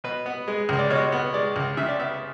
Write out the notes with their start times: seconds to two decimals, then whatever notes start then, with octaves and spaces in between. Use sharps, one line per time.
0.04 B2 B4
0.26 B3
0.48 G#3
0.69 C#2
0.79 D5
0.90 B2 C#5
1.12 B3
1.34 G#3 D5
1.56 C#2
1.77 C#3 E5
1.88 D5
1.99 B3 E5